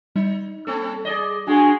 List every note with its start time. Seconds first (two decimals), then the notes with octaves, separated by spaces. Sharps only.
0.16 G3 D#4
0.67 A#3 C4 A4
1.05 G#4 D5 D#5
1.47 G#3 D4 F#4 G#4 G#5